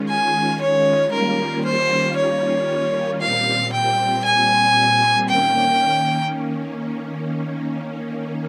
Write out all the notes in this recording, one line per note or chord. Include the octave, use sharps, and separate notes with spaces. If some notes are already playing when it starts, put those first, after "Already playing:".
Already playing: D#3 G#3 C#4 F4
G#5
C#5
D#3 G3 A#3 C#4 F4 A#4
C5
C#5
A#2 G3 C4 F5
G5
G#5
D#3 A#3 C#4 G5